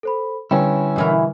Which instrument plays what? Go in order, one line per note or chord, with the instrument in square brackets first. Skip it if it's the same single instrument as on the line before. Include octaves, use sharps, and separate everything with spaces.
[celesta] A4 C5 B5
[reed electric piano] D3 G3 B4 [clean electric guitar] C#4 E4 [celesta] G5
[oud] B2 E3 A#4